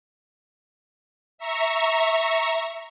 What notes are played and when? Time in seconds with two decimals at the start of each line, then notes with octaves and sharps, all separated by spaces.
1.38 E5 A#5 C#6